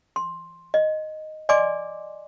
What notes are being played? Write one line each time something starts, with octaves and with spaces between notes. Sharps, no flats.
C6
D#5
D5 D#5 G#5 C6 D6